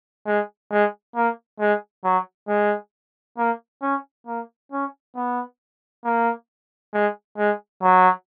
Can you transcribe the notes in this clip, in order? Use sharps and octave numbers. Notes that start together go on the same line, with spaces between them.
G#3
G#3
A#3
G#3
F#3
G#3
A#3
C#4
A#3
C#4
B3
A#3
G#3
G#3
F#3